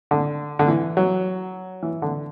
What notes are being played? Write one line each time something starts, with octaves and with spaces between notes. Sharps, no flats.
D3
D3
E3
F#3
E3
D3